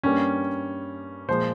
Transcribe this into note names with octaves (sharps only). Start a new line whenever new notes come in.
G2 G3 A#3 C#4
A#2 F3 G#3 C5